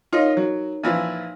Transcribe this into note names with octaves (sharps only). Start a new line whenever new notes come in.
D#4 F4 A#4 C#5 D#5
F#3
A#2 E3 F3